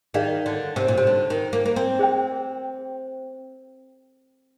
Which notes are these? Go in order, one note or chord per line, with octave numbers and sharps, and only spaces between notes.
D#3 D#4 G#4 D5 F5
D3
C3
A#2
C3
D3
D#3
A#3
A#3
C4
G#4 C5 G5